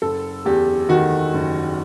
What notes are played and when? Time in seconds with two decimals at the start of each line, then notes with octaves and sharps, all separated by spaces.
0.02 F#1 A4
0.45 E2 G4
0.89 D#3 F#4
1.33 F#1